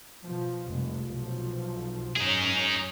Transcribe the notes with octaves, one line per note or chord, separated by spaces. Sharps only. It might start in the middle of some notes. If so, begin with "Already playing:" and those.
B2 F3
F1 C2 G#3
B1 F3
F#2 C#4 D#4 G#4